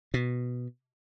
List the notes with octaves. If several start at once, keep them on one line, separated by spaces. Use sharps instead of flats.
B2